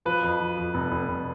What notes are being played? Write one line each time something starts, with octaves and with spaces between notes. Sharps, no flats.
F3 B4
F2
F3
F2
F1
F1
F1